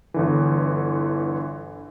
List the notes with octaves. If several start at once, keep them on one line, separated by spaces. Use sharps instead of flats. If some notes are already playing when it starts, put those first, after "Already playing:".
G1 D3 E3